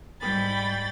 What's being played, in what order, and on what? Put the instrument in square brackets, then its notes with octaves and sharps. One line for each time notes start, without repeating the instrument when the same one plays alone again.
[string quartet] G#2 G3 G5 B5 A6